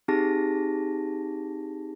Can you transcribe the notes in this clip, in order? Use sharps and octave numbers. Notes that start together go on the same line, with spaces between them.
C4 D#4 G4 G#4 A5 A#6